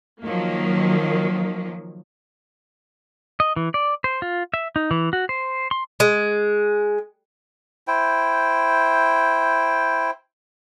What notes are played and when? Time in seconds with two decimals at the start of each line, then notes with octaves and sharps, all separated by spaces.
0.23 D#3 F3 F#3 A#3
3.40 D#5
3.56 E3
3.74 D5
4.04 C5
4.22 F4
4.54 E5
4.76 D#4
4.91 E3
5.13 F#4
5.29 C5
5.71 C6
6.00 G#3
7.87 E4 C5 G5